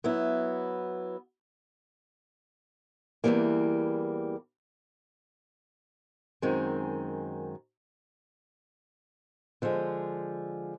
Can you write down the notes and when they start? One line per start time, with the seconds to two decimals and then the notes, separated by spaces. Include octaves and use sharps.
0.04 F#3 B3 E4
3.24 E2 C#3 E3 G3 A#3
6.42 F#2 D#3 G#3 C4
9.62 D3 F3 G#3